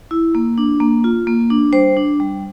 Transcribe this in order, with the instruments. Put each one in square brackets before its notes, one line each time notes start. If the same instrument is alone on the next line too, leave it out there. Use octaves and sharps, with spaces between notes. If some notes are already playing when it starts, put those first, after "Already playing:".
[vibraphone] E4
A#3
D4
A#3
F4
A#3
D4
G3 C5
D4
G3